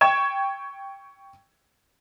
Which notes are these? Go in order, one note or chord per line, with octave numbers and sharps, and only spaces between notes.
G5 C#6 G#6 E7